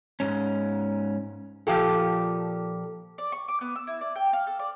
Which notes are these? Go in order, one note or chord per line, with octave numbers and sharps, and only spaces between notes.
G#2 C#4
A#2 F3 G4 A4
D5
C#6
D6
B3
E6
E4
D5
G5
F5
A4
D5